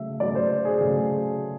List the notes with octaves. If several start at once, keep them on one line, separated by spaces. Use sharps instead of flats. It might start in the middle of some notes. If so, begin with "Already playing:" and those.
Already playing: C#3 F#3 A3 E5
C#3 F#3 A3 D5
C5
G#4
C#3 F#3 A3